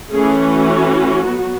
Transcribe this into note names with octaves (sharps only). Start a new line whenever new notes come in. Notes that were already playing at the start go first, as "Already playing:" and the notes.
E3 A3 C#4 G#4
F#4
F#3 B3